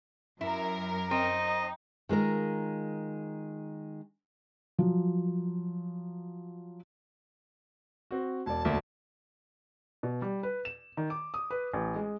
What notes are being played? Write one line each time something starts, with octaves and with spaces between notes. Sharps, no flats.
F#2 E4 A#4
C4 D#4 D#5
D#3 G#3 F4 A#4
F3 F#3
C4 F#4
E1 D5 A5
D2 A#3 E5
B2
G3
B4
E7
D#3
D6
D#6
B4
A1
G#3